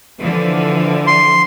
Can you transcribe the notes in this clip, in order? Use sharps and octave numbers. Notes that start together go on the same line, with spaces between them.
D3 E3 F3
C6